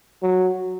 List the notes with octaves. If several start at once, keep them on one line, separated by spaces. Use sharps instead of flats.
F#3